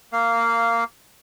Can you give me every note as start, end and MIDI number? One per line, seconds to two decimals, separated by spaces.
0.12 0.84 58
0.12 0.84 77